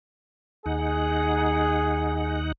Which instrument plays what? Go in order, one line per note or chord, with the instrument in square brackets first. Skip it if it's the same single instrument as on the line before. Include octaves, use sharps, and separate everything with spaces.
[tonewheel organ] D#2 D#4 F#5 [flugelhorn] G#4